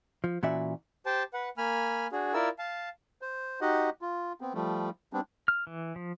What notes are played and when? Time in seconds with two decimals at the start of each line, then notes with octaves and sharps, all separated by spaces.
0.24 F3
0.43 A#2 E3 C#4 F#4 D5 E5
1.06 G4 C5 G5 A5
1.34 B4 F#5
1.57 A#3 G#5 B5 F6
2.12 D4 F#4 G#4
2.34 E4 F4 A#4 D5 E6
2.58 F5 A5
3.22 C5
3.61 D#4 F#4 G4 D#5 F#5
4.02 F4
4.41 B3 C4
4.54 F3 G3 A3
5.13 G3 B3 C4 D4
5.48 F6
5.67 E3
5.96 F3